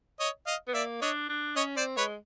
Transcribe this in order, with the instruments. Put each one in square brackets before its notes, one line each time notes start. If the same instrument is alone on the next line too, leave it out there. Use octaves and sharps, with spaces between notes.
[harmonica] C#5 D#5
D#5 F5
[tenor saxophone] B3
[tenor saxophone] A#3 [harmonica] D5 E5
[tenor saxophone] D4 [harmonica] C#5 D#5
[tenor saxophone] D4
[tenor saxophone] C#4 [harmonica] C#5 D#5
[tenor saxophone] C4 [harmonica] C5 D5
[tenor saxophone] G#3 [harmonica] B4 C#5